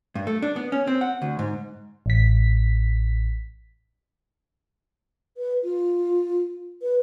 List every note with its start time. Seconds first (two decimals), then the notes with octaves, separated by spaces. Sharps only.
0.15 G2
0.27 A3
0.42 D4
0.56 B3
0.72 C#4
0.87 C4
1.01 F#5
1.22 D2
1.39 G#2
2.06 A1 B6
5.37 B4
5.64 F4
6.82 B4